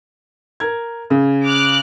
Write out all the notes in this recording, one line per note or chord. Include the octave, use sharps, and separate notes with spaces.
A#4 G#6
C#3
D6 F6 F#6